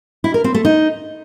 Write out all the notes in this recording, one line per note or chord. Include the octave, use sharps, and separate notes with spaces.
E4
A#4
C4
A3
D#4